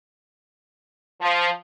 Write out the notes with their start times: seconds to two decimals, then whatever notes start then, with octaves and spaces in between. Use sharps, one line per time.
1.21 F3